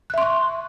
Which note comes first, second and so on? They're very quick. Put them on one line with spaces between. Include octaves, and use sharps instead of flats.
F#6 E5 C6 C#6